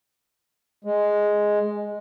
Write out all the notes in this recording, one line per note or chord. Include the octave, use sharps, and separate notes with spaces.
G#3